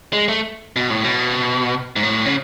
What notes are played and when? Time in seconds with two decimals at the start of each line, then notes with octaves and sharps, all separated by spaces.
0.13 G#3
0.28 A3
0.76 B2
0.90 A2
1.04 B2
1.96 G#2
2.03 A2
2.26 C#3